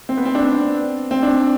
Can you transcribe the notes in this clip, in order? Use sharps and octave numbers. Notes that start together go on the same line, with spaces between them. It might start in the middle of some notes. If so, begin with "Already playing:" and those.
C4
B3
C4
D4
C4
C4
D4